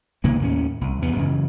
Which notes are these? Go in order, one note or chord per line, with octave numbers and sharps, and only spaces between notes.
C3 D#3 A#3 B3
D#2 A2 G#3 C#4
C2
E2 G2 B3
F#2 C#3 E3